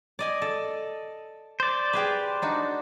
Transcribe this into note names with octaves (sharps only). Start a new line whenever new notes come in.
D5 D#5 G#5
A4
C5 D5
G4 G#4 B4
D4 D#4 F#4